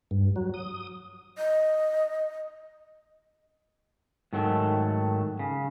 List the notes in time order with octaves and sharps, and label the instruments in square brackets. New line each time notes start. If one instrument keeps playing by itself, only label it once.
[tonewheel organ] G2
F#3
D#6
[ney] D#5
[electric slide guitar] G#2 D#3 F#3 A3
C#3